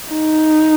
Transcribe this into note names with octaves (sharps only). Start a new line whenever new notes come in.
D#4